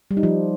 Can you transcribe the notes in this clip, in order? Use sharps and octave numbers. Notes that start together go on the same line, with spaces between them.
G3
D#4
F3